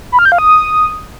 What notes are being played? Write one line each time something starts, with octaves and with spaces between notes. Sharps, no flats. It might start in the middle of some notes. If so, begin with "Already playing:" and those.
B5
F6
G6
F5
D#6